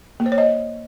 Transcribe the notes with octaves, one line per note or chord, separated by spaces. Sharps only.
A#3
C5
C#5
D#5